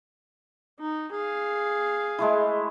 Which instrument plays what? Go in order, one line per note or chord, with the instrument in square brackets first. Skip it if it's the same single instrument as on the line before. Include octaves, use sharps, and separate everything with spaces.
[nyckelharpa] D#4
G#4 F5
[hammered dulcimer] G#3 A3 E4